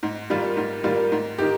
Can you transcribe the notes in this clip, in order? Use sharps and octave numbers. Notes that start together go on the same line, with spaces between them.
G#2
D#3 G3 A#3 F4
G#2
D#3 G3 A#3 F4
G#2
D#3 A#3 D#4 G4